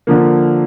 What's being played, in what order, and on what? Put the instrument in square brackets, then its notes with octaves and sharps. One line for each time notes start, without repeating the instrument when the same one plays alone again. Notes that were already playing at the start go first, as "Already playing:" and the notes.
[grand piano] D3 F3 A#3